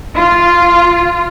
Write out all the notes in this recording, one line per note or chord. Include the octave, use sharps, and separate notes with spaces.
F4